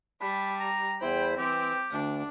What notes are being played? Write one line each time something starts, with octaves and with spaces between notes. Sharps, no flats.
G3 A5 B5
A#5
E2 E4 C5 G5 B5
E3 C4 G4
D2 D4